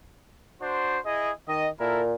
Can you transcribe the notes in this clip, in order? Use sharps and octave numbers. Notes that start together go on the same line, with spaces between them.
D4 F#4 C5
E4 G#4 D#5
D#3 D#5
A#2 E4 A4 A#4